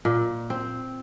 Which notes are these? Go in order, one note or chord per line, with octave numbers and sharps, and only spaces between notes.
A#2
C4